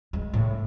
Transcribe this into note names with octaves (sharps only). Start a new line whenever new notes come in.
G#3
A2